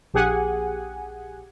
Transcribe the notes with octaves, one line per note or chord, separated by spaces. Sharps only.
A#1 G4 G#4 F#5 G#5